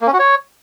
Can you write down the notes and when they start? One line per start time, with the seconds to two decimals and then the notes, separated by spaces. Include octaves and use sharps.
0.01 A#3
0.07 C#4
0.13 F#4
0.20 C#5